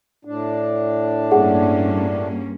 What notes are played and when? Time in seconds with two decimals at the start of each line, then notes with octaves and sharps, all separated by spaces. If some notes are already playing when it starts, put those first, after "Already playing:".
0.25 A2 D4
1.31 G2 A#3 C#4 G#4 F#5